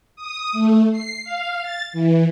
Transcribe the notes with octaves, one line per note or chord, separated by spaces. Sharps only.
D#6
A3
C7
F5
A6
E3